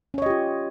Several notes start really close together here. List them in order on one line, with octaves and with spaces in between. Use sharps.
C#4 C#5 D#5 G4 F4